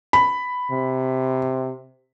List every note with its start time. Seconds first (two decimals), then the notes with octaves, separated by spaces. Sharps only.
0.13 B5
0.71 C3